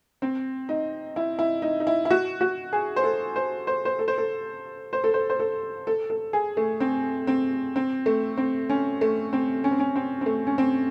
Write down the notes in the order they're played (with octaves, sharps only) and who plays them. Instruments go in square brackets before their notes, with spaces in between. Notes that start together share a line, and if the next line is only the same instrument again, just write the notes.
[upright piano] C4
D#4
E4
E4
D#4
D#4
E4
E4
F#4
F#4
G#4
C5
A4
C5
C5
C5
A4
C5
A4
C5
A4
C5
C5
A4
A4
A4
G#4
A3
C4
C4
C4
A3
C4
C#4
A3
C4
C#4
C4
C#4
C4
C4
A3
C#4
C4